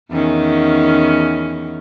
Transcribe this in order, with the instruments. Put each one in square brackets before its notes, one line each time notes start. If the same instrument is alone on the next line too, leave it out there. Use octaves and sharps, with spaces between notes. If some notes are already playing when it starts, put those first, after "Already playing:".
[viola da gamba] E2 D#3 C#4